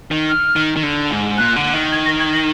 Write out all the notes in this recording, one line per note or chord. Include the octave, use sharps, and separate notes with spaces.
D#3
F6
D#3
D#3
D3
G#2
A#2 F#6
D3
D#3
G#6
A#6
G#6
A#6